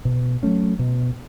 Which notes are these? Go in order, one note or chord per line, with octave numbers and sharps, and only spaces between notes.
B2
F#3 A3 C#4
B2